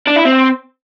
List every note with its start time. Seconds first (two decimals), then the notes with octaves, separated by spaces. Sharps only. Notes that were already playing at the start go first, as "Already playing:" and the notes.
0.07 D4
0.16 E4
0.25 C4